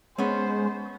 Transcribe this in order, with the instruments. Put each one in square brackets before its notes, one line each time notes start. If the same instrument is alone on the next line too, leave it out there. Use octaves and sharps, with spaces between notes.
[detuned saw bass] G#3 [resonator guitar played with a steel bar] B3 C#4 [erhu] C5